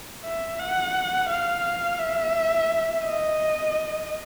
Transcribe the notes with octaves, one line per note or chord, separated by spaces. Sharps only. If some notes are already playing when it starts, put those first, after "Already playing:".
E5
F#5
F5
E5
D#5